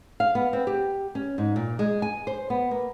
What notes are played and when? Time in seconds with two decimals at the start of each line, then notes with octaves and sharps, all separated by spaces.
0.20 F5
0.35 B3
0.53 C4
0.67 G4
1.15 C#4
1.38 G#2
1.56 A#2
1.79 G#3
2.02 G#5
2.27 C5
2.50 B3
2.71 A#3